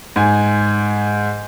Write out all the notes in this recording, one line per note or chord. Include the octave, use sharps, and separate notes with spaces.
G#2 G#5